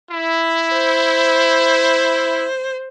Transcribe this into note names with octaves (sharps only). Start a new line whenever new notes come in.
E4
C5